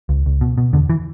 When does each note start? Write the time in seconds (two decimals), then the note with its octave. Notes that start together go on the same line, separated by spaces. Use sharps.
0.09 C#2
0.26 C#2
0.41 B2
0.58 B2
0.73 E2 D3
0.89 E3